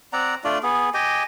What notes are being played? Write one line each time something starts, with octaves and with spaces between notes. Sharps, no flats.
C4 D5 F#5 A#5
A3 D4 F4 D5
B3 G#4
G4 D#5 G5 G#5